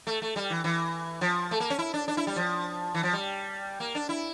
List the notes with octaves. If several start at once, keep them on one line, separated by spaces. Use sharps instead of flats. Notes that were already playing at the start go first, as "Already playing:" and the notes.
A3
A3
G3
E3
E3
F3
A3
A#3
C#4
E4
D4
D4
E4
G3
F3
E3
F3
G3
A#3
D4
E4